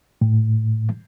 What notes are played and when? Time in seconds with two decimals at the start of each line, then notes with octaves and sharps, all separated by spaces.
0.21 A2